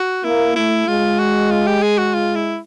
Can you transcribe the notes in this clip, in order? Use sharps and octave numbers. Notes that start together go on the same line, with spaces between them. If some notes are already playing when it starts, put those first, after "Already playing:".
Already playing: F#4
A#3 E4
A3 E4
G#3 F4
F#4
F4
G4
G#4
F#4
F4
E4